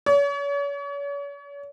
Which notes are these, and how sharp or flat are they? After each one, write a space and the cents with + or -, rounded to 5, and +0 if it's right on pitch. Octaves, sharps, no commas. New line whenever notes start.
C#5 +40